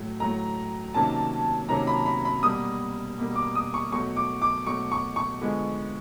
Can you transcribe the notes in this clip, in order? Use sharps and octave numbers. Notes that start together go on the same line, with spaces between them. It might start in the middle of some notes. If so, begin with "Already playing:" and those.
Already playing: A2 F#3 A3
A2 F#3 A3 A#5
C3 D#3 F#3 A#3 C#4 A5
C3 D#3 F#3 A#3 C#4 A#5
B5
B5
B5
B2 G3 A#3 D#6
B2 G3 A#3
D6
D#6
C#6
B2 F#3 A3 C#6
D6
D6
B2 F#3 A3 C#6
C#6
C#6
D3 F3 G#3 B3